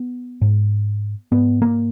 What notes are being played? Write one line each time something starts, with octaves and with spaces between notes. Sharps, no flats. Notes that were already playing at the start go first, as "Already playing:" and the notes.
Already playing: B3
G#2
G#2 B3
A#3